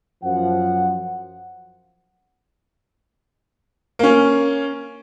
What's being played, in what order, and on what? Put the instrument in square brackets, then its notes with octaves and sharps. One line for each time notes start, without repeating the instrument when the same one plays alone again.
[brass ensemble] F#2 F3 F#5
[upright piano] A#3 C#4